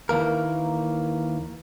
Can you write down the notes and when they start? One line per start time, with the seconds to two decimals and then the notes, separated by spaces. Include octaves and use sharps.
0.09 D#2 E3 A#3 A#4